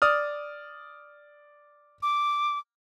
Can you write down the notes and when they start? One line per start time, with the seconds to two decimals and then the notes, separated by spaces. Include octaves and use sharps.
0.02 D5 D#6 F6
2.02 D6